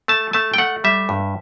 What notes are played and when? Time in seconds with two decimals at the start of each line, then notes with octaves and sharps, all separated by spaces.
0.08 A3 A5
0.33 A3 A5
0.54 G5
0.58 A3 F#5
0.84 G3 E5
1.09 G2